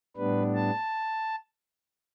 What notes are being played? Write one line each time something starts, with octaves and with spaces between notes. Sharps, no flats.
A2 G3 B3 D4 B4
A5